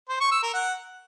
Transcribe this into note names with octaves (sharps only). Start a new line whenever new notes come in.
C5
C#6
E6
A#4
F#5